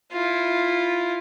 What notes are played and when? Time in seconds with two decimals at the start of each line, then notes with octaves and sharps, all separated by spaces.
0.12 E4 F4